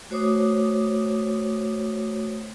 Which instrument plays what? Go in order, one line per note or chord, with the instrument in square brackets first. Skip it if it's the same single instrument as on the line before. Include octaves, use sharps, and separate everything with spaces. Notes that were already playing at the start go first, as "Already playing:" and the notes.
[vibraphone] A3 F#4 C5 C#5 D6 D#6